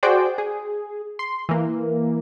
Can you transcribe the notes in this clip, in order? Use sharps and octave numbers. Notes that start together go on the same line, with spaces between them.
F#4 G#4 C5 D5 G5
G#4
C6
E3 A#3